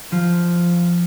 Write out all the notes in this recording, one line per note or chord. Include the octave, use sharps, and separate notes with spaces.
F3 F4